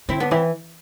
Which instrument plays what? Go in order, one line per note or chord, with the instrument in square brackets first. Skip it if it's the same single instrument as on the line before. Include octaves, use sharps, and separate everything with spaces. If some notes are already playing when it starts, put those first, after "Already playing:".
[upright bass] D3 [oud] C4 E4
[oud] B3 D4
[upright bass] E3 [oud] C4 E4